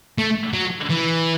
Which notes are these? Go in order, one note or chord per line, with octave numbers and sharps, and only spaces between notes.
A3
F#3
E3